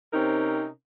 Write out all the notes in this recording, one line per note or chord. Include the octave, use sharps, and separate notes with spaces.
C3 C4 C#4 D#4 A#4